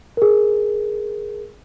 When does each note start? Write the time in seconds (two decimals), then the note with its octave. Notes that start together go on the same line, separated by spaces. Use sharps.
0.17 G#4 A#4